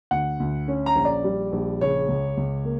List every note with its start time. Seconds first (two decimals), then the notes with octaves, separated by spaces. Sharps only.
0.11 D2 F#5
0.40 D2
0.68 C#4
0.86 A#5
0.96 A#1
1.05 D5
1.24 G3
1.52 A#1
1.81 C#3 C#5
2.08 C#2
2.37 C#2
2.65 A#3